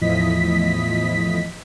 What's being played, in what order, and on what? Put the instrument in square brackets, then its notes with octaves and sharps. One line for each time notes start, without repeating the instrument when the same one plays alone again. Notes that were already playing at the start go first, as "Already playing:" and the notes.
[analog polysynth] E2 A2 F3 E4 D#5 B6